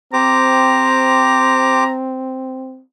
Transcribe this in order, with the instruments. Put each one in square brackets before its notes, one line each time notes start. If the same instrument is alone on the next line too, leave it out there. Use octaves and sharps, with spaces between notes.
[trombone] C4 [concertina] G4 C5 D6 [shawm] A#5